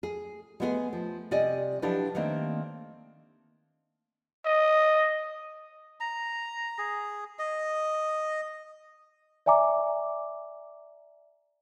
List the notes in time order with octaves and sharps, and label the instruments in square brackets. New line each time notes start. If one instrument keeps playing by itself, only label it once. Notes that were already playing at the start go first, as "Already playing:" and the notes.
[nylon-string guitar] G#4
G#3 A3 B3 F#4 G#4
F3
C3 G3 D5 D#5 G#5
F3 F#3 D4 E4 G4 B4
D#3 A3 A#3 C4 D4
[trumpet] D#5
[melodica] A#5
G#4
D#5
[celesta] D5 E5 G#5 A#5 D6